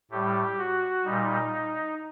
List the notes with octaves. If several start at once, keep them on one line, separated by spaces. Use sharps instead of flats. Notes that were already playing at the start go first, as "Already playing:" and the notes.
A2 G3 G4
F#4
A#2 G3 D#4